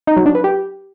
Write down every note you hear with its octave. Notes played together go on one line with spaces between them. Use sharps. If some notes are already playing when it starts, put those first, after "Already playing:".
D#4
F#3
D4
B4
G4